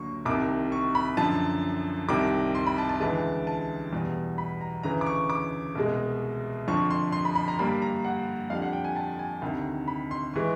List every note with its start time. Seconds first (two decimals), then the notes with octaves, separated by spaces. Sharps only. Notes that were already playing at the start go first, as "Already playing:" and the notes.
Already playing: D2 D3 F#3 A#3 C#6
0.25 C2 C3 D#3 D6
0.72 C#6
0.95 B5
1.17 F#2 D3 F3 A5
2.09 C2 C3 D#3 G3 D6
2.55 C6
2.67 B5
2.78 A5
2.89 A5
3.00 D2 C#3 E3 G#3 A5
3.47 A5
3.93 E2 B2 G3
4.38 B5
4.61 A#5
4.83 D2 C#3 E3 A#5
5.01 D6
5.06 C#6
5.30 D6
5.75 C2 B2 G#3
6.68 F2 D3 F3 C#6
6.90 C6
7.12 C6
7.25 B5
7.35 B5
7.48 A#5
7.59 G2 D3 G3 A#3 B5
7.82 A#5
8.05 F#5
8.50 F2 D3 G3 F5
8.62 F#5
8.73 G5
8.84 G#5
8.96 A5
9.19 G#5
9.42 D2 C3 D#3
9.88 B5
10.11 C6
10.34 E3 G#3 C#6